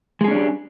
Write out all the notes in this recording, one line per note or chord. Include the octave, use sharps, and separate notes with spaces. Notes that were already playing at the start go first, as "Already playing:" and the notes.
G3 G#3 C#4 D4 G#4